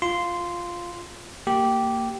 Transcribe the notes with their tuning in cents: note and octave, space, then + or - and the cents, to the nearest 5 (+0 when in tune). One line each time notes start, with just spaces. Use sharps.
F4 +0 C6 -10
A#3 -20 G4 -10